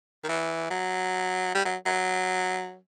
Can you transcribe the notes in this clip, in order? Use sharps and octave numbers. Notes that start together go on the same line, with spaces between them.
D#3
E3
F#3
G3
F#3
F#3